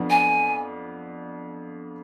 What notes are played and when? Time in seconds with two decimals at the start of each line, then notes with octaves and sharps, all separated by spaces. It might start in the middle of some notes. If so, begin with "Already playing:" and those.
Already playing: F2 F3 B3 D4
0.10 G#5